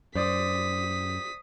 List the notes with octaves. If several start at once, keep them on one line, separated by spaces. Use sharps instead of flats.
F#2 C5 D5 D#6 B6